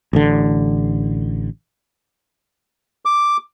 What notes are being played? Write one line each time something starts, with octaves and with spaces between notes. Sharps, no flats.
A1 D3
D6